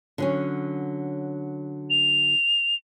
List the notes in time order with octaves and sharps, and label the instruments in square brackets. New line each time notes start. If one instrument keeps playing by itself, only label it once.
[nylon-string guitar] D3 F#3 C#4
[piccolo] F7